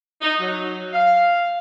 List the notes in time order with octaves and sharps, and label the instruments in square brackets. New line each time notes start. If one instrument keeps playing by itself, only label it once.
[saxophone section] D#4
F#3
F5